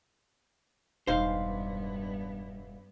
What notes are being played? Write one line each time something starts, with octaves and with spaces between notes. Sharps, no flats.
E1 G2 B3 D#4 C5 F5